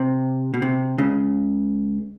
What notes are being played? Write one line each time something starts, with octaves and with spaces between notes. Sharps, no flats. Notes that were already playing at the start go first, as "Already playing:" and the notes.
Already playing: C3
B2
C3
C#2 C#3